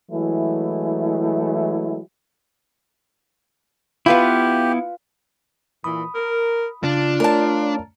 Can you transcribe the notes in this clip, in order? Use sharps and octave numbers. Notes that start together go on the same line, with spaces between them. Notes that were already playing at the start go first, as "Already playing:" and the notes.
E3 F#3 G#3 A3 E4
B3 E4 F4 G4 B4 F5
A#2 E3 B5 D#6
A#4
C#3 D4 F4
A3 A#4 C#5 D5 A5